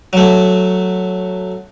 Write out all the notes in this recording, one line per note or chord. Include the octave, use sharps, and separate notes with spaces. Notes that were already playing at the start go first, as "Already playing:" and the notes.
F#3 A3